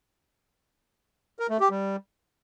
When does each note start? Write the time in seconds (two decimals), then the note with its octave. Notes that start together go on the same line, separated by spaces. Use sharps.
1.39 A#4
1.50 A3
1.60 G4
1.70 G3